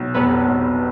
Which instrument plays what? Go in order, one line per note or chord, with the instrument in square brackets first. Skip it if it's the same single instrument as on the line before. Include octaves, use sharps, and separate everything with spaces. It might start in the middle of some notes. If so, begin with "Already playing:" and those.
Already playing: [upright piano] B1
[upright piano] F1 [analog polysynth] B3 B4
[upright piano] F1